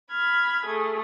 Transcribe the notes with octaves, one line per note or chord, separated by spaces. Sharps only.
B5 F6 G#6
A3 G#4